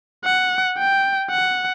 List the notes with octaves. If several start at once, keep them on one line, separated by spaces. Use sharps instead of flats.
F#5
G5
F#5